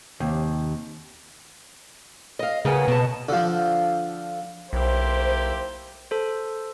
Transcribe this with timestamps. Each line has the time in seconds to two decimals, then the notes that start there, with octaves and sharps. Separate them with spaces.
0.20 D#2 C3
2.39 D#5 F5
2.65 C#3 A#3 B3 G#4
2.88 B2 D#5 A5
3.29 D3 F3
4.73 B1 A#3 E4 G4 C5
6.11 A4 C5